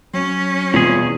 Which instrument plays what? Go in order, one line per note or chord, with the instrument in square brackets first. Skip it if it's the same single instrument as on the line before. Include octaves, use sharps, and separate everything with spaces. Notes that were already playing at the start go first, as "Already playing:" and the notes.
[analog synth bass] F#3 [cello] C#4
[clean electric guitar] E2 G#4 [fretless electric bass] B2 G3 C4 [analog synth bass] F4